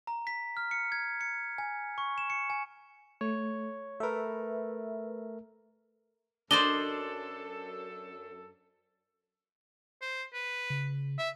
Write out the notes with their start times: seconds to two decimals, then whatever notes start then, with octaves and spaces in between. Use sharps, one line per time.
0.07 A#5
0.27 B6
0.57 F6
0.71 C#7
0.92 G#6
1.21 C#7
1.58 G#5
1.98 C#6
2.18 E7
2.30 C#7
2.50 G#5
3.21 A3 C#5
4.00 A3 A#4 B4 E5
6.51 F#2 D4 A4 C5 D5 D#5 G7
10.02 C5
10.34 B4
10.70 C#3
11.18 E5